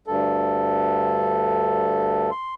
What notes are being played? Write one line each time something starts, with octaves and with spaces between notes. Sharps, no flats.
D2 G2 A4
C6